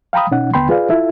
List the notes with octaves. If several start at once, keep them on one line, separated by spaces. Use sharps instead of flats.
F5 G5 A#5 B5 D#6
B2 C#4 D#4 F#5
D#2 D3 B3 G5 B5 C6
F4 G#4 B4 D5 F5
E4 F4 A4 E5